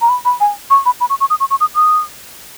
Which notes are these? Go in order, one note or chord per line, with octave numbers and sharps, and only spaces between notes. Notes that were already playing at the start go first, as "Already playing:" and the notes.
A#5
B5
B5
G#5
C#6
B5
B5
C#6
C#6
D#6
C#6
C#6
D#6
D#6